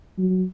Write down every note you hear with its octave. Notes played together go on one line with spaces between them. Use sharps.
F#3